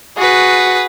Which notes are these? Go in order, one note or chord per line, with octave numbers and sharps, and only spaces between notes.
F#4 G#4 B4